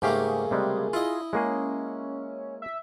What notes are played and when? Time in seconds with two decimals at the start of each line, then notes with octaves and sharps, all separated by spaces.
0.02 G#2 C#3 A3 A#3 G4 G#4 F5
0.51 C3 G3 G#3
0.93 E4 F4 D#5
1.33 G#3 A#3 C#4 G#4
2.62 E5